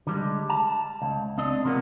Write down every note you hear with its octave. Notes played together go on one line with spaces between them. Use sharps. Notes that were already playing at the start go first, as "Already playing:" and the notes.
D3 G3 G#3
A5
C#2
C4 D4 D#5
C#2 C3 F3 G#3 A#3 B3